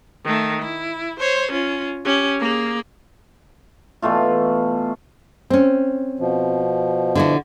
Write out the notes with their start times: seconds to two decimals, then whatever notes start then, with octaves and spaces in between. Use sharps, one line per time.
0.25 D#3 A3
0.62 E4
1.19 C5 C#5
1.52 C#4 F4
2.05 C#4 G4
2.40 A#3 G#4
4.02 B2 E3 A3 F4
5.50 C4 C#4
6.19 B2 F3
7.15 D3 E4 F#4